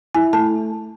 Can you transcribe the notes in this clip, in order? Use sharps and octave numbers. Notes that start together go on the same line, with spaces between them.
E4 G#5
A3 A5